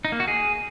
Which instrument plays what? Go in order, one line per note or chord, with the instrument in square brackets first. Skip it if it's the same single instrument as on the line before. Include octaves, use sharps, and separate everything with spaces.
[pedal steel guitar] D#4
A#3
F#4
G#4